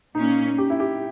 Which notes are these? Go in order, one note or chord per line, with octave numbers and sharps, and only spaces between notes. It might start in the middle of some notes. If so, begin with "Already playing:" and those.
A#2 A#3 C#4 D#4
G4
E4
G4